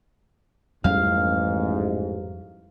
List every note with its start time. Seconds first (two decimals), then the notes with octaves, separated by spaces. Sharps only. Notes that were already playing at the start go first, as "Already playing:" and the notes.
0.84 A1 F2 G#2 G3 C#4 F5